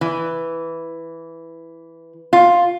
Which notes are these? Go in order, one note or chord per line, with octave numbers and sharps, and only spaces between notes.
E3
F4